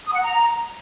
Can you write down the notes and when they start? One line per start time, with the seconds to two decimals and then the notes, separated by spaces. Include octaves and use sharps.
0.05 D#6
0.14 F#5
0.22 A#5